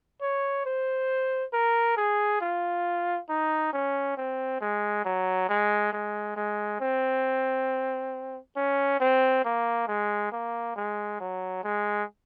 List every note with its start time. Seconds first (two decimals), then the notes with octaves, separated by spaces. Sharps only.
0.21 C#5
0.65 C5
1.53 A#4
1.97 G#4
2.41 F4
3.29 D#4
3.73 C#4
4.17 C4
4.61 G#3
5.05 F#3
5.49 G#3
5.92 G#3
6.36 G#3
6.81 C4
8.56 C#4
9.00 C4
9.44 A#3
9.88 G#3
10.32 A#3
10.76 G#3
11.20 F#3
11.64 G#3